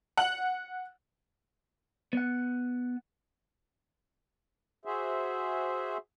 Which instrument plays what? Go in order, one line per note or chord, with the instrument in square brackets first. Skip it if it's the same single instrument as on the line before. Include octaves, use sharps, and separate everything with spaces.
[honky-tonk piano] F#5 F#7
[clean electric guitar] B3 F#5
[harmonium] F#4 G#4 C5 E5